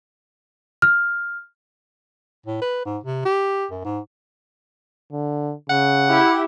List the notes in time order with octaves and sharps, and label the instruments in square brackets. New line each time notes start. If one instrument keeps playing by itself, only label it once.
[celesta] F6
[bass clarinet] A2
B4
G#2
C3
G4
F#2
G#2
[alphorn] D3
[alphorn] C#3 [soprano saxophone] F#5
[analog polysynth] E4 G4